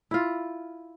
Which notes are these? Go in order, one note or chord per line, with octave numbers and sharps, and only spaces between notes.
E4 F4